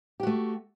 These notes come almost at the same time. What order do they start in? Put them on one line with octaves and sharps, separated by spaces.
G4 F#4 A3